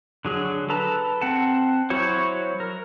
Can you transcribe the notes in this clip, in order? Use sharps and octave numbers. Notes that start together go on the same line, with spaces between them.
D3 F#3 G#4
A4 B4 A5 A#5
C4 F#5 A5
F#3 E4 F#4 C5 C#5
A#4